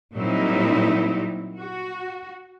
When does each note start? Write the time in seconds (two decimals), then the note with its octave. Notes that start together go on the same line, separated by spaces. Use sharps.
0.16 A#2 F#3 G3 C4 D#4 E4
1.58 F#4